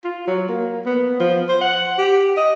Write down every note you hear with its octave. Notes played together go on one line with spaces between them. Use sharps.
F4
F#3
A#3
B3
F3
C5
F#5
G4
D#5